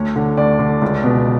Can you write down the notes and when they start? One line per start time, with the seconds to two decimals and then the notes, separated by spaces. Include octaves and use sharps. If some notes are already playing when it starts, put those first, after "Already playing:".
Already playing: D2 C#5
0.16 D3
0.37 D2 D5
0.59 D3
0.82 C#2
1.04 B2